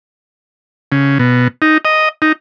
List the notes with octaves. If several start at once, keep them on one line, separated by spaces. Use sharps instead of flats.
C#3
B2
D#4
D#5
D#4